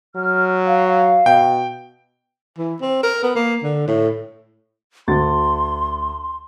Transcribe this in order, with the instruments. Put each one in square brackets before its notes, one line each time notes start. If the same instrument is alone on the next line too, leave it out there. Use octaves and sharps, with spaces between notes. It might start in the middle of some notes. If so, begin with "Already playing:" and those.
[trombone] F#3 [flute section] F6
[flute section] F5
[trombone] B2 [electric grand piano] G5
[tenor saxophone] E3
C4
A#4
B3
A#3
D3
A2
[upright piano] D2 A6 [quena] C6